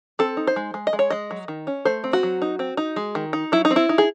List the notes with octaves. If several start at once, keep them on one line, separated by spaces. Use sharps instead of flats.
C4 A4
D#4
C5
G#3
G#3
D#5
G#3
C#5
G#3 D#5
F#3
D#3
C#4
A3 C5
C4
F#4
F#3
D#4
C4
D#4
G#3
D#3
D#4
F#3 E4
D#4
C4
E4
D#4
G#4